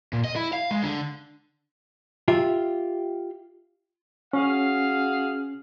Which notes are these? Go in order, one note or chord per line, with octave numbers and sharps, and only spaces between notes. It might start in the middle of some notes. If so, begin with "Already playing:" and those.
A#2
D#5
E4
F5
G#3
D3
F4 G4 E5
C#4 F#4 G#4 F5